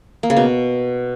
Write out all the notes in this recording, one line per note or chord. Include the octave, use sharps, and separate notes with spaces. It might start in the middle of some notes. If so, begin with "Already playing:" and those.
A#3
C#3
B2